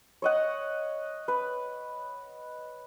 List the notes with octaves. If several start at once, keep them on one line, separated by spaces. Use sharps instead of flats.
C#5 D#5 F#5
B4